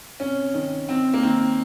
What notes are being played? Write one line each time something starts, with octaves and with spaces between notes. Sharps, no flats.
C3 C#4
D#3
D#3 C4
A#3
D#3 C4